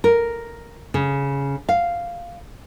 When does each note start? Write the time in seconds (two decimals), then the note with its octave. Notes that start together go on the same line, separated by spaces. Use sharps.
0.04 A#4
0.94 C#3
1.69 F5